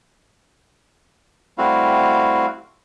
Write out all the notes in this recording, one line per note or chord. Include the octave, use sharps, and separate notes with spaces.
G3 A3 C4 E4 F#4 F5